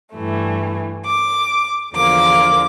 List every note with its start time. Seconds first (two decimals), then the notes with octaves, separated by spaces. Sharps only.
0.15 G2 E3 A3
1.06 D6
1.95 E2 D3 F3 A#3 D6